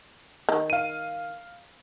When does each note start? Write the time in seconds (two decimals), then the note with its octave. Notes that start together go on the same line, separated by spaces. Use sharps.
0.49 D#3
0.70 F5 D#7